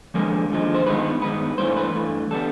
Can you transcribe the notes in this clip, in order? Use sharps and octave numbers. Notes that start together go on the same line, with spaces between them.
D#2 D3 F3 G#3 A#4
D#2 D3 F3 G#3
C5
G2 D#3 G#3 B3 B4
G2 D#3 G#3 B3 B4
G2 E3 A3 C5
B4
G2 E3 A3
D3 G3 B3 A4